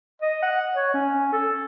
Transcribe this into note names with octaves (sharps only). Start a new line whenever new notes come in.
D#5
F#5
C#5
C#4
A4